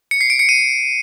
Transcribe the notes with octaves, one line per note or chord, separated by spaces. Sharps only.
C#7
C7
D7
C#7
D#7